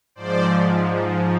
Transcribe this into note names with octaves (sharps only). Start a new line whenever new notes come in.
G#2 F3 C5 D5